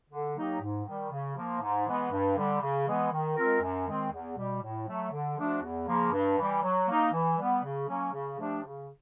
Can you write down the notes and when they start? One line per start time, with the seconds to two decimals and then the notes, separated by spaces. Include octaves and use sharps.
0.09 D3
0.35 F#3 A#3 D#4 G4
0.60 G#2
0.85 D#3 G3
1.10 C#3
1.35 F3 A#3
1.60 G#2
1.86 E3 G#3 B3
2.11 G2
2.36 D3 G3
2.61 C#3
2.86 E3 G#3 B3
3.11 D#3
3.36 G#3 C4 F4 A#4
3.61 F#2
3.87 D#3 G#3 C4
4.11 E2
4.36 B2 G3
4.62 A2
4.87 F#3 A3
5.11 D3
5.36 F3 A3 D4 F#4
5.62 E2
5.87 C#3 F3 A#3
6.12 G2
6.37 E3 G3
6.63 F#3
6.87 A#3 D#4
7.12 E3
7.37 G3 B3
7.63 C#3
7.87 F#3 A#3 C#4
8.12 C#3
8.37 F3 A3 D4 G4
8.63 C#3